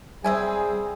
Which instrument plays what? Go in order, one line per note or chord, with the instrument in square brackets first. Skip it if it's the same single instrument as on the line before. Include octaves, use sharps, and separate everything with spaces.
[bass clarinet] G3 [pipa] C4 E5 G#5 [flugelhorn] G#4